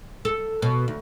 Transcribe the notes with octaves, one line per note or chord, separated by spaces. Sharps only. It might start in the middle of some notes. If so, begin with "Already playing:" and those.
A4
B2
D2